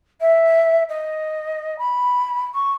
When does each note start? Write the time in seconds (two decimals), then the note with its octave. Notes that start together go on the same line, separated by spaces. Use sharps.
0.21 E5
0.89 D#5
1.78 B5
2.53 C#6